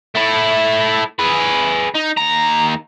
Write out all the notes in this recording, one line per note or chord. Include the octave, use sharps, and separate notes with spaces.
A3 E4
G#4 B4
D#4
D#2 A#5